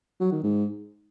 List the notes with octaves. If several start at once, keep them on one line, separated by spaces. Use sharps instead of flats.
F#3
D#3
G#2